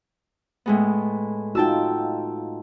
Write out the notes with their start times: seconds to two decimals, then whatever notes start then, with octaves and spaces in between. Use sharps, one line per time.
0.66 A2 G#3 B3
1.55 D#4 F4 F#4 G5 A5 E6